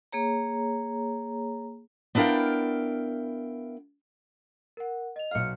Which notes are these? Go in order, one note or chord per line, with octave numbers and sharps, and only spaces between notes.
A#3 G#4 C#5 A#5
B3 D4 E4 A#4 F5 G5
A#4 F#5
D#5 F7
B1 F5 F6 C#7